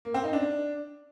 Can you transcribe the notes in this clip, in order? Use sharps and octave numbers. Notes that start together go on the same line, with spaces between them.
A#3
C4
D#4
D4